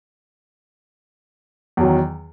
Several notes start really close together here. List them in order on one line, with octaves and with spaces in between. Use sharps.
E2 F#3 D#3